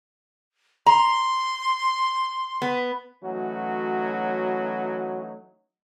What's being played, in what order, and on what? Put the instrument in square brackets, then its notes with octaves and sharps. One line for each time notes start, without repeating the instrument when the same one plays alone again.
[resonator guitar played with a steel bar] A#5 [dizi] C6
[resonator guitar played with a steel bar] B3
[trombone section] E3 F#3 A3 C#4 D#4 F#4